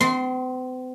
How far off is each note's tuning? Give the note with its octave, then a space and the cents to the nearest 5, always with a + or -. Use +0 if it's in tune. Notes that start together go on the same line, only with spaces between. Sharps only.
C4 -45 C6 +0